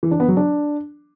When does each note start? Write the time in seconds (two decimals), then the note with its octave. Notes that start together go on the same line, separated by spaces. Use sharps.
0.03 E3
0.11 D4
0.20 B3
0.28 F#3
0.37 D4